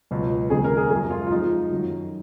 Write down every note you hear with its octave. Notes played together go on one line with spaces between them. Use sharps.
C#2 B2 F#3
D#2 C#3 G#3 G#4
A#4
G#4
F#2 F3 G#3 G#4
F4
F4
F2 F3 G#3 D#4
F#2 D#3 F#3